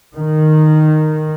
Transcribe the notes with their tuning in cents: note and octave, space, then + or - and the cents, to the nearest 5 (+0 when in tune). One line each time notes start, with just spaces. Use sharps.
D#3 -10